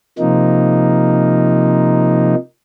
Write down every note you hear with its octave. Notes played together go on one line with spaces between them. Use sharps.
C3 F3 A#3 D#4